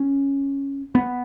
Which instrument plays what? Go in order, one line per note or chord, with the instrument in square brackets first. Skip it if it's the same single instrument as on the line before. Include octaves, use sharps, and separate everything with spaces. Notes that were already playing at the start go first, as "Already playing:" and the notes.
Already playing: [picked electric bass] C#4
B3